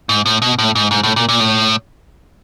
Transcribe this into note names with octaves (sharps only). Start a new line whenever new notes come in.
G#2
A2
B2
A2
G#2
G#2
A2
A#2
A#2
A2